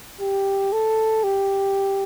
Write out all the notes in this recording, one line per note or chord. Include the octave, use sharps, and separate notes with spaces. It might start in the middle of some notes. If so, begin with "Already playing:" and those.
G4
A4
G4